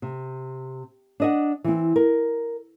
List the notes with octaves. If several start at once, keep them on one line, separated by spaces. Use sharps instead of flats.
C3
D4 D#5 F#5
E3 C4
A#4